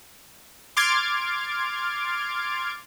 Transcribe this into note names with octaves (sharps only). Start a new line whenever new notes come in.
C6 D6 F6 G#6 A6 D7